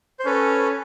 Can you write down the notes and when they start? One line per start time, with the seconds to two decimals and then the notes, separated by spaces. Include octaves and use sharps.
0.20 C5
0.26 C#4 A4 B4